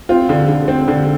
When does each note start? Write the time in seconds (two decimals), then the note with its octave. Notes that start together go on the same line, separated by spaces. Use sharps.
0.09 C4 F4
0.29 D3
0.49 D3
0.68 C4
0.88 D3